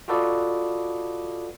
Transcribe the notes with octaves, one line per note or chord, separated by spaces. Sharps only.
F4 F#4 A4 B4 D5 D#5